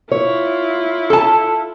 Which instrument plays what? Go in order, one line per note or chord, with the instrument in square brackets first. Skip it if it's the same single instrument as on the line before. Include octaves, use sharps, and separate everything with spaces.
[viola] E4 F4 [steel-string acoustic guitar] C#5
[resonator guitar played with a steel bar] A4 A5